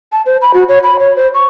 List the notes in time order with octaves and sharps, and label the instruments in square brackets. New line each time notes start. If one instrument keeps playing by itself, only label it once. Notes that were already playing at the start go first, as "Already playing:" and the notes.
[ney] A5
C5
B5
F#4
C#5
B5
C#5
C5
C#6